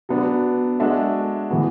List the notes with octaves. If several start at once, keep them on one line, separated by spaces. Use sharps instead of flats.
F#3 B3 D4
G#3 D4 F#4 A4 E5
A2 E3 B3 F#4